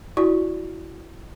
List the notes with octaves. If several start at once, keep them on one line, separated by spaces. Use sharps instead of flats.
E4 F#4 D5 C#6